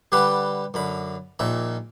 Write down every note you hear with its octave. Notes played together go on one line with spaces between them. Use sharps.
D3 G3 G4 B4 F#5 B5
F#2 D3 B5
A#1 A#2 D#3 E5